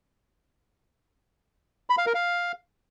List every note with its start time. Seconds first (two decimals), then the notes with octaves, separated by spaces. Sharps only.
1.90 B5
1.98 F5
2.06 A#4
2.14 F5